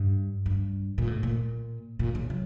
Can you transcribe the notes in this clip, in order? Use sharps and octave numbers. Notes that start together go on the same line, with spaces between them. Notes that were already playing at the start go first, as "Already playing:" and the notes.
Already playing: G2
G2
A#2
A2
A#2
A#2
C#3
F#3